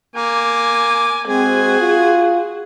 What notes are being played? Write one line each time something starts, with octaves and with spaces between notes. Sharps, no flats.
A#3 G#5 D6
G#3 C4 F#4 G#4 G#5
F4